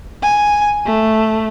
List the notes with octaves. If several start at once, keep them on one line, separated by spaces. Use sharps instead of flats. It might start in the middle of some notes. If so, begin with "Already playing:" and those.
G#5
A3